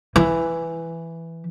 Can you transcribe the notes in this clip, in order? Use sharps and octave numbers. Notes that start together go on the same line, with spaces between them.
E3